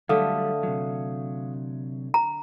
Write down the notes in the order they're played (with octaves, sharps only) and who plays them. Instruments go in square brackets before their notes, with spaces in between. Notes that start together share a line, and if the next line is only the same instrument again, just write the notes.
[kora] D3 A3 [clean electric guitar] F#3 G3 [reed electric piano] F5 D#6
[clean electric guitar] C3 F#3
[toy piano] A#5